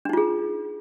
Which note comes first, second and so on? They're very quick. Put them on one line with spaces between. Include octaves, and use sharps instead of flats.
D4 D#4 F4 G#4